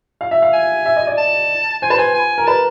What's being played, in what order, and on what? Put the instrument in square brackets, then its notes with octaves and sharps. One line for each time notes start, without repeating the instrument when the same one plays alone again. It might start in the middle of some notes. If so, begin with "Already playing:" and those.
[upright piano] F5
E5
F5
[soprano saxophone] G#5
[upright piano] E5
D#5
D5
[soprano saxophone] A5
[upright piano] C5 [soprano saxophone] G#5
[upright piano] B4 [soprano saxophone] A5
[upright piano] C5 [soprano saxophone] G#5
[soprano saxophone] G#5
[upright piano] A#4
[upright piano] B4 [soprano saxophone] A5